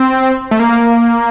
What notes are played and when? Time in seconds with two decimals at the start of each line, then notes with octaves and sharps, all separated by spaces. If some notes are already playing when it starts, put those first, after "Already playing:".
Already playing: C4
0.51 A3
0.60 A#3